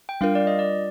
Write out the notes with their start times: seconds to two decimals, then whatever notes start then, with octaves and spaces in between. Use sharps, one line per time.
0.09 G5
0.21 G3 D4 F4 A#4 F5
0.35 D5
0.47 D#5
0.59 D5